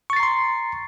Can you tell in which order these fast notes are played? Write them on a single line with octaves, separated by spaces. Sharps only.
C#6 A6 C7 A#5 C6